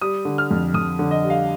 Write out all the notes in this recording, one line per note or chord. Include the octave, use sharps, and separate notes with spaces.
G3 D#6
D3
F6
F2
F2 D#6
D3
D#5
G3
F5